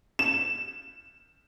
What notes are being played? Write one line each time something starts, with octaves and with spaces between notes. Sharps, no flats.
E7